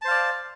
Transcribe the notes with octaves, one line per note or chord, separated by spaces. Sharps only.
C5 D5 F5 A5